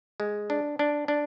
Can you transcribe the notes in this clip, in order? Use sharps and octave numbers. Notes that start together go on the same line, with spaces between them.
G#3
D4
D4
D4